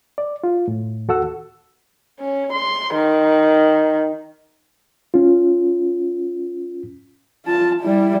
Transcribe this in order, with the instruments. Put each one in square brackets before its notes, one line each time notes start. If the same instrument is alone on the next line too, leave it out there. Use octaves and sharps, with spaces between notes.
[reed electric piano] D5
F4
A2
D#2 F#4 A4 F#5 E6
[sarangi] C#4
C6
D#3
[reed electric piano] C#4 F4
[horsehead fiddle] F4 A5
G3 E4